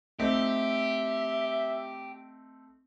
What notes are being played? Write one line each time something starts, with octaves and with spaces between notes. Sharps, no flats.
A3 C4 D#4 G4 E5